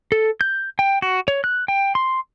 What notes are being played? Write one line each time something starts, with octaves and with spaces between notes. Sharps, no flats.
A4
G6
G5
F#4
C#5
F#6
G5
C6